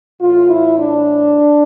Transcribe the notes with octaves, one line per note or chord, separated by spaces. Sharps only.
A2 E3 F4
E4
D4